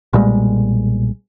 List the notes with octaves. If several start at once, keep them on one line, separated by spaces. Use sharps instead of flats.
B1 A#2 G3 G#3